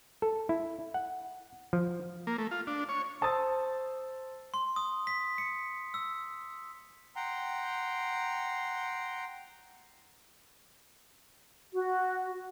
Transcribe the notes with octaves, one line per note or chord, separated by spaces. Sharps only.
A4
E4
F#5
F3
A#3
A3
F4
D4
C#5
C5 A5 D#6 E6 A6
C6
D#6
B6
C#7
E6
F#5 G5 A#5 C6
F#4